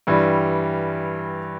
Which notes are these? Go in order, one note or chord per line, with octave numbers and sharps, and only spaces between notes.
G2 E3 G3